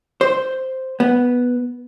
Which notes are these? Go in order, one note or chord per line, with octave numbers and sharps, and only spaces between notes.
C5
B3